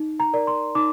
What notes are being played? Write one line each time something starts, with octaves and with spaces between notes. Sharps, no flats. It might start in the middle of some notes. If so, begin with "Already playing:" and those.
Already playing: D#4
A#5
A#4 D5
C6
D#4 D6